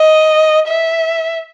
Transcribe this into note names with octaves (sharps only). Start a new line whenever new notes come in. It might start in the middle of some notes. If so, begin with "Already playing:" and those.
Already playing: D#5
E5